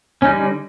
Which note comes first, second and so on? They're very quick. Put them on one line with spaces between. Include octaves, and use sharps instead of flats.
C#4 D#4 G3 D3